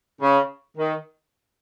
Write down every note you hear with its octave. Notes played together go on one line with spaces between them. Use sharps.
C#3
D#3